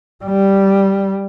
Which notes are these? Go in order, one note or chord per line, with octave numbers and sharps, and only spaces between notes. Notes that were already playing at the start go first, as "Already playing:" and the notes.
G3